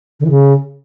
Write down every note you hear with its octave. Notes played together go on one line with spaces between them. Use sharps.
D3
E3
C#3